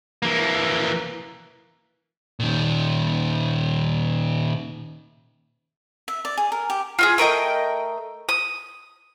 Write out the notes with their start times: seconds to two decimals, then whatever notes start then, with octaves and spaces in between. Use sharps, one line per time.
0.22 E3 A#3
2.40 A#2 D#3
6.08 E5
6.25 D5
6.38 G#4
6.52 A#4
6.70 G4
6.99 F4 F#4 G#4
7.18 A3 A#4 D#5 G5
8.29 D#6